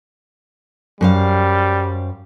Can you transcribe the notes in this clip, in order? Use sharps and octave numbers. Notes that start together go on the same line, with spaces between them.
F#2 G3 C5 F5